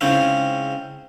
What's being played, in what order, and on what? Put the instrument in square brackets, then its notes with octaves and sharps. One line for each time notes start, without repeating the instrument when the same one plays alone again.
[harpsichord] G#2 C#3 C4 C#4 E4